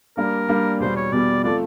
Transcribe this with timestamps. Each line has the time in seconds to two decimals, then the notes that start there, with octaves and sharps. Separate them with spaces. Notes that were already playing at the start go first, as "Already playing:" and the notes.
0.17 G3 A#3 D4 A#4
0.49 G3 A#3 D4
0.80 E2 B2 G3 C5
0.97 C#5
1.12 E2 B2 G3 D5
1.44 F3 A3 C4 F4 A4 D5